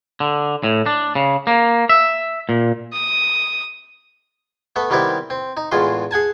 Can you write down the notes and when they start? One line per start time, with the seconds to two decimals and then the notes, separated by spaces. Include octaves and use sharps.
0.20 D3
0.63 A2
0.86 D4
1.15 C#3
1.47 A#3
1.89 E5
2.49 A#2
2.94 D#6
4.76 A3 B3 A4
4.90 D#3 G3 B3 C4 E4 G4
5.30 C4
5.57 D#4
5.71 E2 A2 G#3 F4 C6
6.11 G#4 F#5 G#5 A5